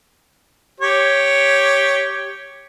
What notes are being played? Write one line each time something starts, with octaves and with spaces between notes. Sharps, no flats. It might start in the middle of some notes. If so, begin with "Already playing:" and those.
G4 C#5